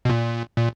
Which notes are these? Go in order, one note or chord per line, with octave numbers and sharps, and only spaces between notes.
B2
A#2
A#2